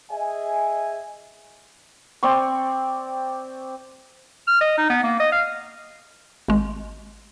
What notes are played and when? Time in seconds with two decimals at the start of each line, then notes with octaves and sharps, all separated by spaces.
0.11 G#4 D#5 E5 G#5
2.23 C4 D5 C6 C#6
4.47 F6
4.61 D#5
4.78 D#4
4.90 B3
5.04 A#3
5.20 D#5
5.32 F5
6.48 G#1 G#3